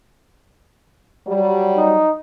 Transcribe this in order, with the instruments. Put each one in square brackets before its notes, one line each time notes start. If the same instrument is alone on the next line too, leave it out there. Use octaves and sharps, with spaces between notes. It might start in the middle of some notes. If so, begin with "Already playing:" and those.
[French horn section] F#3 G3
[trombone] D#4